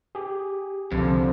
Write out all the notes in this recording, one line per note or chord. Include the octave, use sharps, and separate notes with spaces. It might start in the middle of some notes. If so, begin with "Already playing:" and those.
G4 G#4
C2 F2 D3 F3